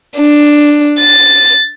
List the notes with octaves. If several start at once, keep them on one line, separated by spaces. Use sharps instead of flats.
D4
A6